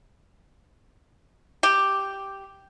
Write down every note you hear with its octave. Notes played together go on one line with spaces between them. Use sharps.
G4